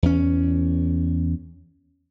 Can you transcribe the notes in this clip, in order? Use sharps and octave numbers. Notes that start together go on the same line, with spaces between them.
E2 C#4